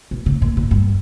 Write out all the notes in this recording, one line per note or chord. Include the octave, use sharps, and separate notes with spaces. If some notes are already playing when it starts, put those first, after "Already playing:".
B2
C#3
A#2
A#2
G2